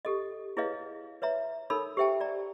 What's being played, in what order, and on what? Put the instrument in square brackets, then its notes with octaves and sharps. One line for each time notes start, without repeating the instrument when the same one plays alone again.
[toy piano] G4 A4 D#5
E4 G#4 B4 C#5 D#5 F5
B4 C#5 E5 A#5
D#4 A4 A#4 C#5 B5 E6
G4 C5 E5 G5 A5
D5 A#5